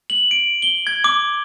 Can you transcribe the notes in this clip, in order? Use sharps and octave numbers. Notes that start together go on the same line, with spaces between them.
F#7
D7
G7
G#6
D6